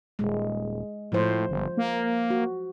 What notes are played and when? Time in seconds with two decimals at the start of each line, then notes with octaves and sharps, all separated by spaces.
0.19 D#1 G#3
1.12 A2 F3 C5
1.49 G1
1.77 A#3
2.30 F#4